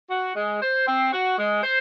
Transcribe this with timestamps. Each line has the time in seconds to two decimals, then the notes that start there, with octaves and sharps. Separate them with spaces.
0.10 F#4
0.36 G#3
0.61 C5
0.87 C4
1.12 F#4
1.38 G#3
1.63 C5